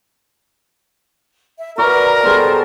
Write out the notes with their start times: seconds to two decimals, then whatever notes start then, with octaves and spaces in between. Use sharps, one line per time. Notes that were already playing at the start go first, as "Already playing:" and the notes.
1.57 E5
1.78 F#4 A#4 B4 D5 F#5 A#5
2.23 B2 G3 G#4 A4 C5 A#5